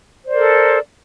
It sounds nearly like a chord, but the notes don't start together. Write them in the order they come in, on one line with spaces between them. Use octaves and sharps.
C5 D5 A#4 A4